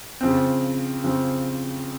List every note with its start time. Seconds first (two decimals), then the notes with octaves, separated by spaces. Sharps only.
0.21 C#3 F3 C4
1.04 C#3 F3 C4